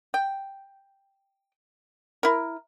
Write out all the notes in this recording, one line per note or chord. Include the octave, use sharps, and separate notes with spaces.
G5
E4 A#4